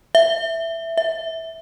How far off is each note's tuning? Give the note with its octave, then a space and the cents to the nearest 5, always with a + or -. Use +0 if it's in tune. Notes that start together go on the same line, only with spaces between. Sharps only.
E5 +5
E5 -15